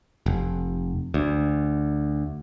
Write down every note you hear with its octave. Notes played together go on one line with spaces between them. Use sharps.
F1
D2